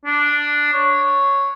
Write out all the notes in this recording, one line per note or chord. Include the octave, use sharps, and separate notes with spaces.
D4
C#5